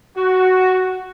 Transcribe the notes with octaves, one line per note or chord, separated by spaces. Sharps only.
F#4